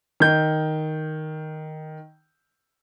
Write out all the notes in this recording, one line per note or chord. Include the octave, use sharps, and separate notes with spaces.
D#3 G6